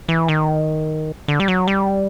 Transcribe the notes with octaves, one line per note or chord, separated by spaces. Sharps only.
E3
D#3
D3
G3
F#3
G3